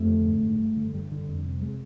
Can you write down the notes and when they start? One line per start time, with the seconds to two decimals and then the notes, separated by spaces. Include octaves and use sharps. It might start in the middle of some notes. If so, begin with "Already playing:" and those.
Already playing: F2 A3
0.08 D3
0.26 G#2
0.44 G#2
0.59 G2
0.76 D3
0.94 G2 G3
1.12 D3
1.28 F2
1.45 C3
1.62 G#3